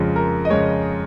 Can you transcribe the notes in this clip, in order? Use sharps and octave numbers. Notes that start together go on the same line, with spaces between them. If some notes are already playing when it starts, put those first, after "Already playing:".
Already playing: F2 C#3 G#3 F4
A#4
D#5
F2 C#3 G#3 C#5